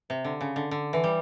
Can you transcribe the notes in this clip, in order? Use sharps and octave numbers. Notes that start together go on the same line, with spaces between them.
C3
D3
C#3
D3
D3
E3
G3